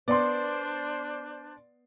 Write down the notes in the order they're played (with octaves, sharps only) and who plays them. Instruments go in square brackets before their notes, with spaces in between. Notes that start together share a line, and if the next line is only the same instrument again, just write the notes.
[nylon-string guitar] B3 [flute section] D4 C5 [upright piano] D5 C6